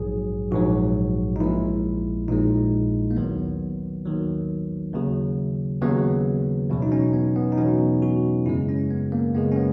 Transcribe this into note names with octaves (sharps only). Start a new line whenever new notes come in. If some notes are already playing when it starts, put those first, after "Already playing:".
Already playing: A#1 G#2 F#3 G#4
A#1 G#2 F#3 F#4
D#4
A#1 A#2 G#3 E4
A#1 A#2 G#3 D#4
A#3
D#2 D#3 F#3 B3
D#2 D#3 F#3
D#2 C#3 F#3
D#2 C#3 F#3 B3
E2 B2 F#3
D#4
C#4
B3
B3
D#4
E2 B2 F#3 C#4
F#4
F#2 C#3 G#3 E4
C#4
B3
A#3
F#2 C#3 G#3 B3
C#4
B3